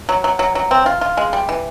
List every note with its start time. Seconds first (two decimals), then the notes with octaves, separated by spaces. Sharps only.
0.09 F#3
0.24 F#3
0.39 F#3
0.55 F#3
0.71 C4
0.86 F4
1.01 F4
1.17 G#3
1.33 G3
1.49 E3